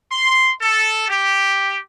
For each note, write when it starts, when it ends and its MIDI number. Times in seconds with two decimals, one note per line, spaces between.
0.12 0.50 84
0.60 1.08 69
1.09 1.77 67